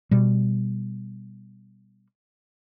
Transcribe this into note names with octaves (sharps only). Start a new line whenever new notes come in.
B2 G3